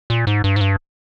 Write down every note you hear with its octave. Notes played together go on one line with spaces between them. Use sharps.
A#2
G#2
G2
G#2
G2